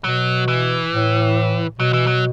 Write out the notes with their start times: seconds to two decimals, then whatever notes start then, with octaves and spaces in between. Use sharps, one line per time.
0.04 B2 F#3
0.48 E3
0.93 A2
1.79 B2 F#3
1.93 E3
2.07 F#3